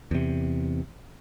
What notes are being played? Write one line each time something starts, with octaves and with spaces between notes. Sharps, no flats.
E2 C3